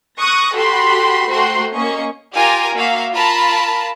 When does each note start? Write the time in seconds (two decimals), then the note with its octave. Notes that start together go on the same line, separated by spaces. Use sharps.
0.18 C#6 D#6 F#6 A#6
0.53 F#4 G4 A4 B5 C6
1.28 A3 F#4 C5 G5 A#5 C6
1.74 A#3 C#4 D#5 C#6
2.36 F4 G4 A#4 F5 G#5
2.76 A#3 F#4 E5 F5
3.13 F4 A#4 A5 B5